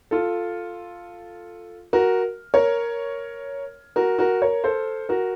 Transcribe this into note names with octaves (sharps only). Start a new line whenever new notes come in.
F4 A4
F#4 A#4
A#4 C#5
F#4 A#4
F#4 A#4
A#4 C#5
A4 C5
F#4 A#4